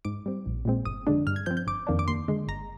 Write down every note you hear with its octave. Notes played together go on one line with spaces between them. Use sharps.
G#2 D6
G3 C4
A#1
A#2 G#3 C4
G1 D#6
F2 D3 G#3 D4
G2 F6
G#6
F3 C4 G6
G6
G1 D6
F2 D#3 A#3 D4
D6
D#2 C6
D3 G#3
G1 A#5